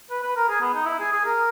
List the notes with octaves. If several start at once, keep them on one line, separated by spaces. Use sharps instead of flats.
B4
B4
A#4
G#4
B3
D#4
E4
G#4
G#4
A#4